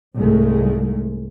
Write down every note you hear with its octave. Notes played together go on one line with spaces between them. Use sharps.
C2 G#2 G#3 A3